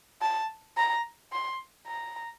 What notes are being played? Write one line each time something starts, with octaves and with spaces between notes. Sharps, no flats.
A5
A#5
C6
A#5